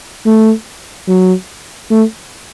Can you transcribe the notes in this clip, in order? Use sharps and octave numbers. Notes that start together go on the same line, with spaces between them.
A3
F#3
A3